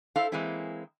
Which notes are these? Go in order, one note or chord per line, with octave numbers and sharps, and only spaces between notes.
E4 A4 C5 F5
E3 G#3 A#3 C4 E4